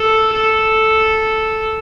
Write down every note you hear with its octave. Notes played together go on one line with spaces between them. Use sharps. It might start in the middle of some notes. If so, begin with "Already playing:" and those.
Already playing: A4
A4